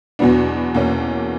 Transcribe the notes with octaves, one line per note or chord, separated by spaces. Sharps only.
E2 B2 F#3 B3 D4
E2 B2 A#3 C#4